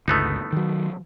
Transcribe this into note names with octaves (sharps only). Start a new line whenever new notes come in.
G1 C#2 A3 B3 D#4
D#3 F#3